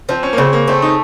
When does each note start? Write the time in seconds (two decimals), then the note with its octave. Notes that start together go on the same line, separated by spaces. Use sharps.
0.09 F3 C4
0.23 C#4
0.33 A#3
0.37 C#3 C4
0.53 A#3
0.68 A3 C4
0.82 D#4